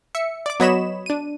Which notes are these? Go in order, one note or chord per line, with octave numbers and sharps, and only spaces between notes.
E5 C#7
D5 D6
F#3 B3 C#5 D#5 B5 E7
D4 D#7